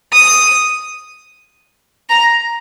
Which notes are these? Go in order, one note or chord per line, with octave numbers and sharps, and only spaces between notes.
D#6
A#5